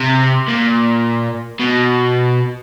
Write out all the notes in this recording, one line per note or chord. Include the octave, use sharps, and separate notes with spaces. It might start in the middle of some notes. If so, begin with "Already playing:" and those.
Already playing: C3
A#2
B2